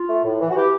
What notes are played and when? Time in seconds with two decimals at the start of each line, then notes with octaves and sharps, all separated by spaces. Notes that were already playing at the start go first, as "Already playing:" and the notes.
Already playing: F4
0.09 A3
0.24 A2
0.40 E3
0.50 F#4
0.56 E3 G4